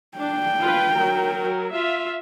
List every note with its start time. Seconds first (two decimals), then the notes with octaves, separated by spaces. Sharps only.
0.18 D4 G5
0.60 F4 B4
0.93 F#3 A#4
1.73 F4 E5